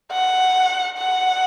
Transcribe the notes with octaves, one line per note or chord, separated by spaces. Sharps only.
F#5
F#5